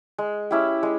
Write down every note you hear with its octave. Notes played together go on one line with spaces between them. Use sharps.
G#3
C#4 E4 G4
G#3